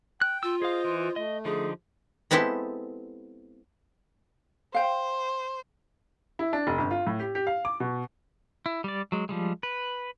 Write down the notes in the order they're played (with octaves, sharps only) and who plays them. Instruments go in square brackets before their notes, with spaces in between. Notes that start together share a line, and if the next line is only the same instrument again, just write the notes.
[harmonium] G5 [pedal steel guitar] F#6
[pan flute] F4 [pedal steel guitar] E6
[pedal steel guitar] G#4 F5 [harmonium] C5 D#5
[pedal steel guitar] E3
[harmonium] A3 [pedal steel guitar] D#5
[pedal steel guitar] D3 F3 D#4 [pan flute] G#4
[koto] G#3 B3 C4 E4 G4 A4
[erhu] C5 [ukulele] F5 G5
[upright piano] E4
D4
F1
G1
F4
A2
G4
G4
F5
D6
B2
[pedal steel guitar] E4
G3 D5
F#3 G#3
F3 G3 G#3
B4